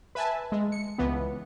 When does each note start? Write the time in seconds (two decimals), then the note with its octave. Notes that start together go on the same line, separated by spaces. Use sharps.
0.15 B4 E5 G#5 A5
0.52 G#3
0.72 C#7
0.98 C#2 E3 B3